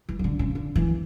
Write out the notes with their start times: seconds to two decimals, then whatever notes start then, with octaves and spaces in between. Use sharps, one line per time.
0.09 E3
0.19 E3
0.24 D3
0.39 C#3
0.55 D3
0.76 E3